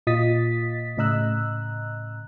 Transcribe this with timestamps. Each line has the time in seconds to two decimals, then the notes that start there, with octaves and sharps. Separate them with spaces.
0.07 A#2 F4 D#5 D#6 A6 B6
0.97 A2 C#3 D#5 A#5 E6 F#6